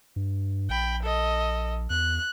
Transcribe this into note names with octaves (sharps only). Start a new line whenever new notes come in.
G2
A#1 G5 B5
A4 D#5
E2 F#6